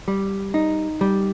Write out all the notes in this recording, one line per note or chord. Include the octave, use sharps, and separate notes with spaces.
G3
D#4
G3